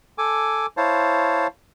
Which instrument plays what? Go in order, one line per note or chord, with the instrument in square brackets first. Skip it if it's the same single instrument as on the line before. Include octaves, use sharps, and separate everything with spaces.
[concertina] A4 G#5 D6
E4 C5 C#5 F5 A5